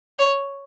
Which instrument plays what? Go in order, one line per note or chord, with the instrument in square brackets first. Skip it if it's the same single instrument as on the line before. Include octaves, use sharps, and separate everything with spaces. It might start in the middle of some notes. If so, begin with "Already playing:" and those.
[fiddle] C#5